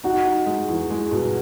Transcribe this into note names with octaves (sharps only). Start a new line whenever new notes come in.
D#4 F#4
D#4
G#3
E2
G#3
B2